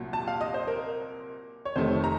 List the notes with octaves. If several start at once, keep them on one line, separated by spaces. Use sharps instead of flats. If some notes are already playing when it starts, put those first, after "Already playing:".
Already playing: C2 A#2 F#3
A5
F5
D#5
C5
A#4
C#5
F1 F2 C3 D#3 A3 C5
A#5